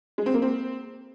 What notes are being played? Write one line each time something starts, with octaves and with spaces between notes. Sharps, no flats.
G#3
C4
A#3
C4